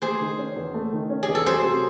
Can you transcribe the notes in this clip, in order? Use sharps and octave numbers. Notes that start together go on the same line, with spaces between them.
A3 G#4 C5
D#3
C#4
E2
A3
D#3
C#4
G#4
E2
A4
F#3 G#4 C5
C3